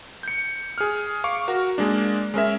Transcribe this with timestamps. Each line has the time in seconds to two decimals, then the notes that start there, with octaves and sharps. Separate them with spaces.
0.23 G6 C#7
0.78 G#4 F6
1.24 F5 C#6 D6
1.48 F#4 A#4
1.78 G#3 A#3 D4
2.34 G#3 C#4 A#4 E5